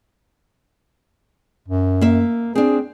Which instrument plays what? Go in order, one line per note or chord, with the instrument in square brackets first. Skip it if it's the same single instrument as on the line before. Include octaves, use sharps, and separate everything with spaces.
[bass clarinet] F#2
[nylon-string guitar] A#3 E5
[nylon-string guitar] C4 D4 [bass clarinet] G#4